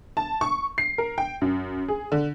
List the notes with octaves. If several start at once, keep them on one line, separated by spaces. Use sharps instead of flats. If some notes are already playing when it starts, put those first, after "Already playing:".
A5
C#6
C7
A#4
G5
F#2
G#4
D3